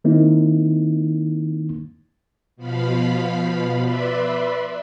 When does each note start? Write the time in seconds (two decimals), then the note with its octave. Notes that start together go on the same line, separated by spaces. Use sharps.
0.04 D#3 A#3 C4 D#4 E4
2.56 B2 F3 F5 B5
3.84 B4 D5 E5 B5 C6